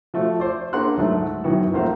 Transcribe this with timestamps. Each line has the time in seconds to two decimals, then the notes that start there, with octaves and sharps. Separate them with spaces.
0.14 F3 A3 F#4
0.40 C5 D5
0.73 A#3 D4 G#4 F#5 C6 F#6
0.97 D2 G#2 F#3 A3
1.44 F#2 D#3 E3 B3 F#4
1.74 A#1 A3 A#3 C4 C5 F5